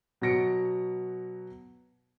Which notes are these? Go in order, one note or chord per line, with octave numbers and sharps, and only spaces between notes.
B2 F#3 F#4 A#6 C#7 D7